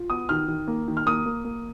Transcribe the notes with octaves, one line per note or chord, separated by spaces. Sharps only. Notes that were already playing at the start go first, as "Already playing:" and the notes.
Already playing: F4
B3 D#6
D#3 F6
D#3
A#3
D#3
F6
A#3 D#6
A#3
A#3